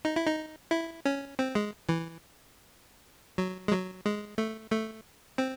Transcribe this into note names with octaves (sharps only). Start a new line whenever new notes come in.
D#4
E4
D#4
E4
C#4
C4
G#3
E3
F#3
G#3
F#3
G#3
A3
A3
C4